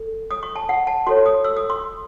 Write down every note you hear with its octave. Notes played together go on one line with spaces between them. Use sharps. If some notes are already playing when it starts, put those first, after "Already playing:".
Already playing: A4
D#6
C#6
A5
F#5
A5
F#4 A4 C#5 C6
D#6
E6
D#6
C6